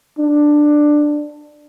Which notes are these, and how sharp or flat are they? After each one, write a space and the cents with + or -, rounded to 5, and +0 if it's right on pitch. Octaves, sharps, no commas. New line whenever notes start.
D4 +10